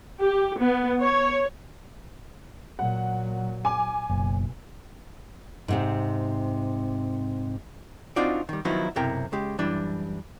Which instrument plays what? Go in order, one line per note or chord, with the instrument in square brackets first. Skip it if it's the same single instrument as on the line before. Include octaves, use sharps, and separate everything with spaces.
[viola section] G4
B3
C#5
[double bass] A#2 F#3 [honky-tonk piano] F#5
[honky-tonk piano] G#5 D6
[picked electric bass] F#1 [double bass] B1
[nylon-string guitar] G#2 C3 C4
[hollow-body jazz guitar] C4 D4 D#4 F4 F#4 D5
D#3 G3
D#3 F3 F#3 B3 D#4 E4
B1 F#2 C3 E4 A#4 G5
C#3 G#3 G4
F#2 E3 G3 D4